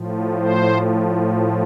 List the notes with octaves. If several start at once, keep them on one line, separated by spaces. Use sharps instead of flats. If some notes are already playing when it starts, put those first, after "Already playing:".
Already playing: A2 F3
C5